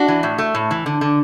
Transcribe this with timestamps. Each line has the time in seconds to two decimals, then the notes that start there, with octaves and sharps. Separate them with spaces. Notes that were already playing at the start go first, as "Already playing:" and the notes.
Already playing: D4 F#4
0.08 E3
0.23 A2
0.38 A3
0.55 A2
0.71 E3
0.86 D3
1.01 D3